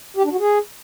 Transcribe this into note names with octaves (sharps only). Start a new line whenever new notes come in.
G4
D4
F#4
G#4